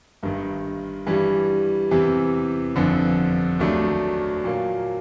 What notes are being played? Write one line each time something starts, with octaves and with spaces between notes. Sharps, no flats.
G1 G2 D#3
G2 E3 G3
E2 C3 E3
G1 F2 D3
D#2 D#3 F#3 A3 D4
A#2 F#3 A#3